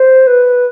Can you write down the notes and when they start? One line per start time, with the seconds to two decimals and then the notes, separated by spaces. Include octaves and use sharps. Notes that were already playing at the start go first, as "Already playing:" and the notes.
Already playing: C5
0.27 B4